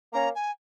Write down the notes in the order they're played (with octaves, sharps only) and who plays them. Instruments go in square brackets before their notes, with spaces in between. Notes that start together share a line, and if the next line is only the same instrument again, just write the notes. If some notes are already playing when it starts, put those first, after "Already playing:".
[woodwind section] A#3 C#4 [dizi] A#5
[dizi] G#5